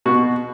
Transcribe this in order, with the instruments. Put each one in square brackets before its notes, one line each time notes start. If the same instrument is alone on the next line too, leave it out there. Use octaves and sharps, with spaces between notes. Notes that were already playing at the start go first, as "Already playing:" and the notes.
[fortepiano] B2 F#4